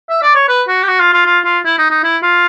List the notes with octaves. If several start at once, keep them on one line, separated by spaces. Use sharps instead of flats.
E5
D5
C#5
B4
F#4
G4
F#4
F4
F4
F4
F4
E4
D#4
D#4
E4
F4